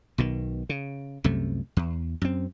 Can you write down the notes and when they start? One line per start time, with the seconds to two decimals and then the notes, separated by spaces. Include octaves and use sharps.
0.18 B1 B2 D#3
0.69 C#3
1.24 C2 F#2 C3 A3
1.77 E2
2.22 F#2 C4